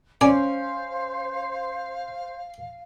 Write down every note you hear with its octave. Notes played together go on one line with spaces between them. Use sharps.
C#4 C5 D5 F5 G#5